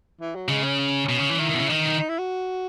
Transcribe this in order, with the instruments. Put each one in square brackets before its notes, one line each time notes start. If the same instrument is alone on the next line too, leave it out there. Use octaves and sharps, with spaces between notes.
[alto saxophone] E3
F#3
[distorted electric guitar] C#3 [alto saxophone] G#3
[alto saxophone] C#4
[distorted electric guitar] B2
C#3
E3
[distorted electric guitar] D#3 [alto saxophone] E4
[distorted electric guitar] D#3
B2
C#3
[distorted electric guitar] D#3 [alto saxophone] D#4
[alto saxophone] D#4
E4
F#4